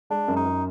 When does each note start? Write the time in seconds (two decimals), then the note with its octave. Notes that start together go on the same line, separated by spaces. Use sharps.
0.10 G#3 D4
0.28 F#2
0.37 D#4
0.45 F#2